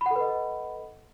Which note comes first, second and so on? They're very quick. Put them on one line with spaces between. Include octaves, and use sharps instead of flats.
B5 F#5 A4 B4 D#5